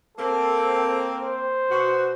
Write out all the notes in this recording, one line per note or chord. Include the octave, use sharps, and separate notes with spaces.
A#3 C4 A4
C5
B2 F#4